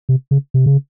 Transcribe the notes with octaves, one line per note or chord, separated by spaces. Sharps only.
C3
C#3
C3
C#3